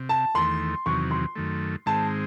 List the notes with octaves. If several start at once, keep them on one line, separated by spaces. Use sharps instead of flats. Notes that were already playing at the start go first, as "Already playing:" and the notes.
Already playing: C3
A5
E2 D#3 A3 C6
E2 C3 D#3 F#3 C#6
C6
F#2 D#3 A3
G#2 D#3 G#3 C4 A5